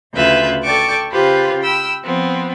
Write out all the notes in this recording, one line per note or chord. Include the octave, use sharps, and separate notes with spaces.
D2 C#3 F4 B4 E5 G6
A4 D5 G5 A5 C#6 D6
C#3 F4 G4 B4 C5
G5 B5 E6 F6
F3 B3 C4